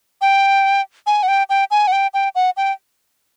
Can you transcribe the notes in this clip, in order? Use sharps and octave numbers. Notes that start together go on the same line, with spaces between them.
G5
G#5
F#5
G5
G5
G#5
F#5
G5
G5
F#5
G5